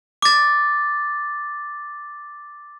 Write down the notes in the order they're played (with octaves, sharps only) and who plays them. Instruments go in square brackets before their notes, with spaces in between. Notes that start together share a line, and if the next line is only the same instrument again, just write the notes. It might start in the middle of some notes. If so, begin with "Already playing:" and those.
[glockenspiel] D6 A6